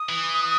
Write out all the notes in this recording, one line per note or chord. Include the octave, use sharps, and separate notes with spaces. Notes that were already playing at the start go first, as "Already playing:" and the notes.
Already playing: D#6
E3